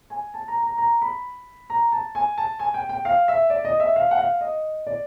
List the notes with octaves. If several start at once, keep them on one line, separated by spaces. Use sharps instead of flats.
G#5
A5
A#5
A#5
A#5
B5
A#5
A5
G#5
A5
G#5
G5
G5
F5
E5
D5
D#5
E5
F5
F#5
F5
D#5
D5